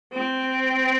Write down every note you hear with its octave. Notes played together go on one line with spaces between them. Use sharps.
C4